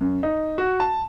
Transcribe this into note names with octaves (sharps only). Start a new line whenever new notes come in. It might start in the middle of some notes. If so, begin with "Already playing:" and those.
F#2
D#4
F#4
A5